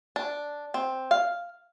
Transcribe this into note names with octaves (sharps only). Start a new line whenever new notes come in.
D4
C4
F5